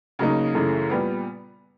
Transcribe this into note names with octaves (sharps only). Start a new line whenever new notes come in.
C#3 F#3 A#3 D#4
F#2 C#3 E3 A3
A#2 G3 B3